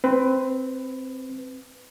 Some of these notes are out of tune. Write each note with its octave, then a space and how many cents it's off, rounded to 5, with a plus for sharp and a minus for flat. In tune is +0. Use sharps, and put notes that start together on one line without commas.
C4 +0 B4 +20